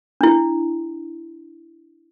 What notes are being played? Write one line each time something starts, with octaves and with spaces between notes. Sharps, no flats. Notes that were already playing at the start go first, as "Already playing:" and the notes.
D4 E4